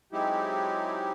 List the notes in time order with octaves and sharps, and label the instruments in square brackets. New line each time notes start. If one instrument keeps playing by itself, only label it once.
[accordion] F#3 G#3 C4 D#4 E4 G4